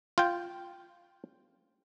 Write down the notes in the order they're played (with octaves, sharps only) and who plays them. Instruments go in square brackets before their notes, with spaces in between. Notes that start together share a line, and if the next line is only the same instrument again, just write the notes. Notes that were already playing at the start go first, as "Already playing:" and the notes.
[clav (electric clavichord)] F4 G5